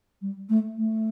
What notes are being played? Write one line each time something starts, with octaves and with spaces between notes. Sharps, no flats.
G3
A3
A3